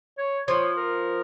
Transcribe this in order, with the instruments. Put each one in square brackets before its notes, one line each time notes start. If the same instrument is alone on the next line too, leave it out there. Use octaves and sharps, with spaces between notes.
[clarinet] C#5
[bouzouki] F3 [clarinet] C#5
[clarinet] A#4